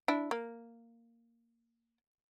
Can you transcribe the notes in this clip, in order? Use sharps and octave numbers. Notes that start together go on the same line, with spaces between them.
D4 E4
A#3